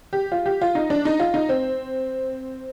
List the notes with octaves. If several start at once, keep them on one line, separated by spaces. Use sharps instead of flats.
G4
F4
G4
F4
D#4
D4
D#4
F4
D#4
C4